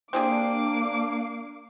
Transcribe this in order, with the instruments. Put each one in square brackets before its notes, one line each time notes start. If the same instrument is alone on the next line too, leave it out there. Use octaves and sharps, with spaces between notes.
[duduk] A#3 [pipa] C4 G4 G#4 [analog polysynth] D4 C7 [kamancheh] D6